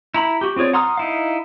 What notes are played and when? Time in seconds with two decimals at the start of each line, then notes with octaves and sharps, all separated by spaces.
0.14 E4 A#5 B5
0.41 F#4 G4
0.56 C4 F4 G#4 C#5 D5
0.73 F#5 A#5 C6 D#6 F6
0.97 D#4 E4 F5